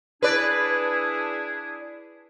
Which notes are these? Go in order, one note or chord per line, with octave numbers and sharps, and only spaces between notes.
D4 E4 G#4 B4 D5